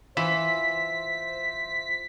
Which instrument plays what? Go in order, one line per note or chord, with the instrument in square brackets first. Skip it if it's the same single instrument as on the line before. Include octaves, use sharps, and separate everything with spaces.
[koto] E3 [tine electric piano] F4 E5 [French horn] C5 [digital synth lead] B6